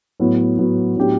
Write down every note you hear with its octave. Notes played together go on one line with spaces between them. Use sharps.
A2 F#3 B3
A2 F#3 B3
A2 F#3 B3 D4 G4